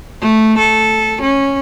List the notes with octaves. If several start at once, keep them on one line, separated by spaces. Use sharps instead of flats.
A3
A4
C#4